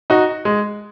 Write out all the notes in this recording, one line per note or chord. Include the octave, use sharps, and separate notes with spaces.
D#4 F#4
G#3